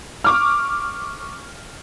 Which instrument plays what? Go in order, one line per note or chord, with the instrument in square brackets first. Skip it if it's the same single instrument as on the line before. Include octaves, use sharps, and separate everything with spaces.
[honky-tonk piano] C#6 D6 F6